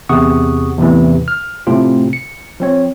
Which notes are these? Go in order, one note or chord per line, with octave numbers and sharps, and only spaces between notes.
E2 C3 G#4 F#5 C#6 D#6
E2 A2 C3 E3
F6
A2 C3 A3 C4 F4
C#7
F3 C4 C#5